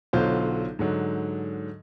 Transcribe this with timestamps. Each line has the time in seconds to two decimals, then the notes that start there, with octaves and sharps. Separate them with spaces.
0.13 B1 D3 F#3 F4 C5 G6
0.79 G#2 D3 F#3